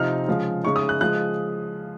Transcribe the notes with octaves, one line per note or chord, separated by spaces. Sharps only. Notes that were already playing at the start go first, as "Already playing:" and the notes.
Already playing: C3 F3 C4 D#4 F6
C#3 F3 G#3
C#3 G#3 D#4 C#6
D#6
F#6
C#3 F3 G#3 F#6